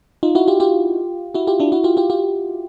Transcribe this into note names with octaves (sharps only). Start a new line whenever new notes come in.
D#4 F4
E4 F#4
F4 G4
F4 G4
E4 F#4
F4 G4
D4 E4
E4 F#4
F4 G4
F4 G4
F4 G4